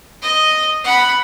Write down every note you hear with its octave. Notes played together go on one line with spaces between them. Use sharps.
D#5
F#5 B5